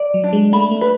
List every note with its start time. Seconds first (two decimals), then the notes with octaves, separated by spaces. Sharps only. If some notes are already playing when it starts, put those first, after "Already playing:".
Already playing: D5
0.14 F#3
0.24 D4
0.33 G#3
0.53 A3 B5
0.71 A3
0.81 B4